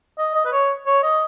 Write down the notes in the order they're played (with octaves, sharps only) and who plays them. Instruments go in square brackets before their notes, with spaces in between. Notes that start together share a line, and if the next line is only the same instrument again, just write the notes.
[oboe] D#5
D#5
B4
C#5
C#5
D#5